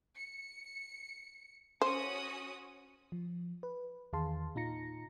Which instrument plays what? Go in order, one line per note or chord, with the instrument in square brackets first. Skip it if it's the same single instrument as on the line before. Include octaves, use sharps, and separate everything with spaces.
[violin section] C#7
[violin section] C#4 F#4 D#6 [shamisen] C5
[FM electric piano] F3
B4
E2 D#3 G#4 F5 A5 C6
A#2 D#4 F4 A#5 A#6 C#7